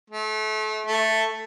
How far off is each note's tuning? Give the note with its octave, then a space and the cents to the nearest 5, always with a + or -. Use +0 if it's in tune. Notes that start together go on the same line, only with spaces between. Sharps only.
A3 -35
A3 +5